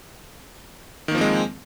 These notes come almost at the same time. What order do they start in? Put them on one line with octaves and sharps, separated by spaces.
D#3 A#3 F3 C4 G#3